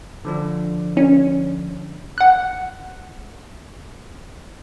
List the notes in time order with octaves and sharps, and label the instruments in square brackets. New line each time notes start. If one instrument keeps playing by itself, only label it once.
[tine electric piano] D3 F3 D4
[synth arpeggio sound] C#4
F#5 F#6